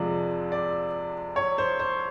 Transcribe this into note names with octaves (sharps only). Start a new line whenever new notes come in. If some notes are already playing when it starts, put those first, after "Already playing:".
Already playing: F2 C3 F3 G#3 D5
D5
C#5
C5
C5